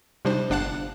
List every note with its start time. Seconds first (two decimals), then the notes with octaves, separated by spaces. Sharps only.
0.25 C3 G3 D4 D#4 C5
0.50 G1 D4 F5 F#5 A5 F#6